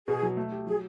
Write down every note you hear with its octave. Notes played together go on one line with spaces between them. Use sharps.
B2 G#4
F#3
A3
G4
F#3 G#4